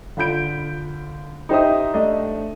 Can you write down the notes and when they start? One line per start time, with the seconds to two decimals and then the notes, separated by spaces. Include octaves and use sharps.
0.17 D3 F4 B5 G6 D7
1.49 D#4 G4 C5 E5 D#6
1.94 A3 D4 D#5